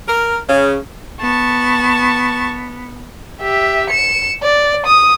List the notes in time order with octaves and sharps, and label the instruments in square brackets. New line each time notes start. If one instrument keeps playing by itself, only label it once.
[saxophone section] A#4
C#3
[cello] B3 [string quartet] A5 C#6
[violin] G4 E5
C#7 E7
D5
D#6